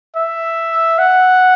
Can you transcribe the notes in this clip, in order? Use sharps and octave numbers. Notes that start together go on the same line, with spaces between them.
E5
F#5